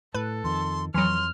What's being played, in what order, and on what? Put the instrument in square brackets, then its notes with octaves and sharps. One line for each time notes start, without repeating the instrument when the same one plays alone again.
[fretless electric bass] A2 [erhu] A4 [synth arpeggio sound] B4
[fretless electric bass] F2 D#3 [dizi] C6
[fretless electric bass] F2 [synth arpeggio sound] E3 F#3 [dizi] C6 [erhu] F6